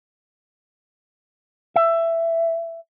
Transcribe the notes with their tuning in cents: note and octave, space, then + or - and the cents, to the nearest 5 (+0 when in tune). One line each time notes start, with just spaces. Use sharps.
E5 +15